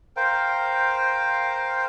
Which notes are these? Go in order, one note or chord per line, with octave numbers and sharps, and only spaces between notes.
A#4 C5 F5 G5